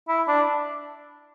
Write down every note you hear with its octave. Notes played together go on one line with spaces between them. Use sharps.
E4
D4